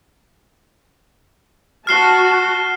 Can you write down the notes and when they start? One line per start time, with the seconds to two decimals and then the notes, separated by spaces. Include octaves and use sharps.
1.87 F#4 A5 F6 C7 G7